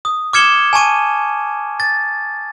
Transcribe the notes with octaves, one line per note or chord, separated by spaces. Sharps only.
D#6
D6 F6 G#6 C#7 E7 G7
G#5 A5 C#6 D#7
A6